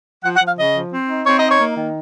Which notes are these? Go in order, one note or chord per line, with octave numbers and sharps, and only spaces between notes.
F3 F#5
F#5
F3 F5
C#3 D#5
F3
C4
D#4
C4 C#5
D#5
D#4
C#5
A#3
D#3